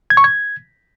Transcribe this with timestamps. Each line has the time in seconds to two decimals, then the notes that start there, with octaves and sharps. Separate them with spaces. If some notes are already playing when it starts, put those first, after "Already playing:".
0.10 G#6
0.17 C#6
0.24 G#6